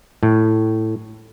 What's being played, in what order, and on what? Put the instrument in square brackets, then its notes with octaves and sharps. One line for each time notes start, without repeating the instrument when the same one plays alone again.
[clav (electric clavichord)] A2